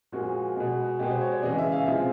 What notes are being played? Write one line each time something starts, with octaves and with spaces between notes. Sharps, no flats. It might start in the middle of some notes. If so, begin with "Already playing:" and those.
A#2 F3 G#3 F#4
B2 G#3
B2 G#3 G4
C5
C#5
D5
C#3 E3 G#3 D#5
E5
F5
C3 F3 G#3 E5